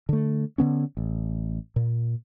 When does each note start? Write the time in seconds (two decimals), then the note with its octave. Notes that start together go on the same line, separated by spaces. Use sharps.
0.09 D3 A3
0.58 D3 B3 C#4
0.97 A1
1.76 A#2